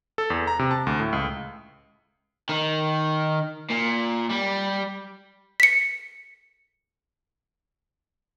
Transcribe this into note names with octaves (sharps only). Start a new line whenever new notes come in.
A4
E2
A#5
C3
A5
D2
A2
C#2
D#3
A#2
G3
B6 C#7